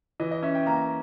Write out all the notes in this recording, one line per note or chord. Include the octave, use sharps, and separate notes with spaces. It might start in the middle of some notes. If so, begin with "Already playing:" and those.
E3 D#5
D#5
C#4 E5
G5
A#3 A#5